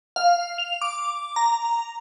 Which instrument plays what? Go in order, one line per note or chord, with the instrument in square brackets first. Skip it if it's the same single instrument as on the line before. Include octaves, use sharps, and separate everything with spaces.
[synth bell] F5
F7
D6
A#5